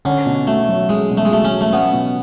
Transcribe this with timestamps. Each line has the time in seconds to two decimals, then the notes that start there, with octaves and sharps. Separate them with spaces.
0.05 D3 C#4
0.26 B2
0.47 A3 F#4
0.69 F#3
0.89 G#3 C#4
1.11 B2
1.17 A3
1.25 G#3
1.31 A3 F#4
1.45 C#4
1.51 F#3
1.61 A3
1.72 B3 C#4
1.93 B2